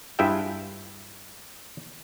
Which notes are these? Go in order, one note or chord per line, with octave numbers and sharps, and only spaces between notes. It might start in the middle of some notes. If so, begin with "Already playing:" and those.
G2 E4 F4 G#4 E5 G5